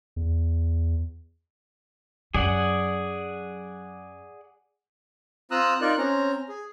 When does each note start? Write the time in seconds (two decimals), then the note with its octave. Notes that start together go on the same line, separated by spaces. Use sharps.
0.16 E2
2.34 F#2 F#3 G#4 D5 F#5
5.51 C4 F4 A#5 D#6 E6 F#6
5.81 D#4 F4 A#4 D5 F#6
5.98 C4 C#4 A#5
6.49 G#4